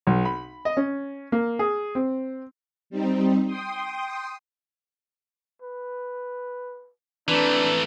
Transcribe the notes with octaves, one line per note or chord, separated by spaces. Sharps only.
B1
B5
D#5
C#4
A#3
G#4
C4
G3 C4 D#4
G5 C6 D#6
B4
E3 A3 C4 D4 B4 A#5